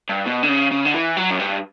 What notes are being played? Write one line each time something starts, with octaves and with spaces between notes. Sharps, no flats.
G2
B2
D3
C#3
C#3
D3
E3
F#3
F#2
G2